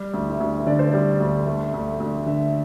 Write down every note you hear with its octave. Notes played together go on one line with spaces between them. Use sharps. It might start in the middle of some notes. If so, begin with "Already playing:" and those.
Already playing: G3 G4
D2
E4
D2
D3 D5
C5
G3 D5
D2
A3
D2
D2
D3 E5